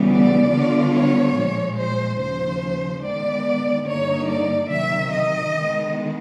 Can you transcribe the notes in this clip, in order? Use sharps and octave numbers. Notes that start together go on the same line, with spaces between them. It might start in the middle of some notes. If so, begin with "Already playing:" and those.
Already playing: D2 C#3 E3 G3 B3
D5
D3 G3 B3 D4 F4
C#5
A#2 F3 G#3
C5
D#2 C#3 F3 C5
D#3 G#3 B3 D5
G2 D3 G3 A#3 D#4 C#5
D5
C3 D#3 F#3 E5
D#5
D#3 G#3 B3